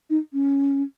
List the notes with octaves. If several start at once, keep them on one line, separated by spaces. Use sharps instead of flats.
D#4
C#4